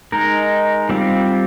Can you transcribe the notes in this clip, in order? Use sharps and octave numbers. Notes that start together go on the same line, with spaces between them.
G#3 D#4 A#4
G3 C4 F4